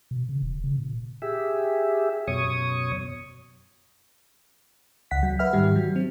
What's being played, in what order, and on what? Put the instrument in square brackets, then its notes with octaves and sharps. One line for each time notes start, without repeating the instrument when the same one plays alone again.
[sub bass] B2
C#3
E1
C#3
A#2
[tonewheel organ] G4 G#4 E5
F#2 B2 C#5 C#6 D#6
[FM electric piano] C#2 F#5 B6
F#3
B4 E5 F#5 F6
G#2 D#3 G3 G4
F#3
C4